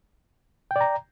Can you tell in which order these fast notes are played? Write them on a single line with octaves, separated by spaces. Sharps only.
G5 D5 A#5